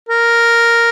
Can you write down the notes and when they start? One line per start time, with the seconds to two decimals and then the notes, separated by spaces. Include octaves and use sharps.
0.09 A#4